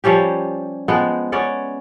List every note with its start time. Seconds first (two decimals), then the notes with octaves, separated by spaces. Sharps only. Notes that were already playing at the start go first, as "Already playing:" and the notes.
0.04 F3 G3 C#4 G4
0.88 F3 G#3 B3 G5
1.32 B3 C#4 D5